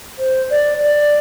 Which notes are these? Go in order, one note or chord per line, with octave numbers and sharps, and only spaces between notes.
C5
D5
D5